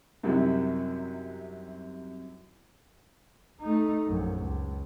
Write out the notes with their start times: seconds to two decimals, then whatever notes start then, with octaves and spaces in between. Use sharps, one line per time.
0.23 F#2 C3 F#3 G3 D#4 E4
3.61 A3 D#4
4.07 A#1 F#2
4.38 C#2